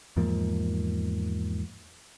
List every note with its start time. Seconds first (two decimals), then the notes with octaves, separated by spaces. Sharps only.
0.17 E2 G#2 F3 A#3